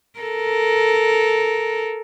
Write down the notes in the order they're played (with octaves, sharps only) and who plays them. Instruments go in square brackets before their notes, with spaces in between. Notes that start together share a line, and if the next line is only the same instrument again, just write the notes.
[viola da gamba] A4 A#4